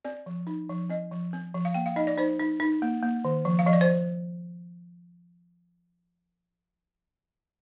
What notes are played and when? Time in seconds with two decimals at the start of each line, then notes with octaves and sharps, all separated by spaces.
0.05 C4 D5
0.26 F3
0.47 D#4
0.69 F3
0.90 C4 D#5
1.11 F3
1.33 C4
1.54 F3
1.65 F5
1.74 A#3 G5
1.86 F5
1.96 D#4 D#5
2.07 D5
2.18 D#4 C5
2.40 D#4
2.60 D#4
2.82 A#3
3.03 A#3
3.25 D#3
3.45 F3
3.59 F5
3.66 F3 D#5
3.73 D5
3.81 C5